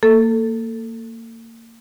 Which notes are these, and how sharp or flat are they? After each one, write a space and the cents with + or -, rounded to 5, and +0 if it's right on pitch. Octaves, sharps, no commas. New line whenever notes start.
A#3 -30 A4 +10